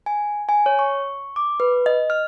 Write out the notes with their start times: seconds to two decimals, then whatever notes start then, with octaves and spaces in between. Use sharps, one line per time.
0.06 G#5
0.49 G#5
0.66 C#5
0.79 C#6
1.36 D6
1.60 B4
1.86 D#5
2.10 F6